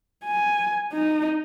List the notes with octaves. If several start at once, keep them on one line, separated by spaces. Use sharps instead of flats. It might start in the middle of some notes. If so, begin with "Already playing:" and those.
G#5
D#4